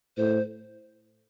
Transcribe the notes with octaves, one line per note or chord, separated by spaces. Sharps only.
A2 C5